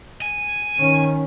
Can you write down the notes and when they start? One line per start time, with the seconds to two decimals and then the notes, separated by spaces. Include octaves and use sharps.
0.22 G#5
0.77 D#3 C#4